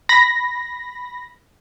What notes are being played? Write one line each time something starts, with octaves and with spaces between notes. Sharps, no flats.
B5 A#6